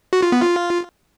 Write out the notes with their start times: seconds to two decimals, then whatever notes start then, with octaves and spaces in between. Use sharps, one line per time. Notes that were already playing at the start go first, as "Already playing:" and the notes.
0.13 F#4
0.22 F4
0.32 B3
0.42 F4